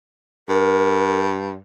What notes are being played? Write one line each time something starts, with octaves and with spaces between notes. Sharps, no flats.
G2 A#4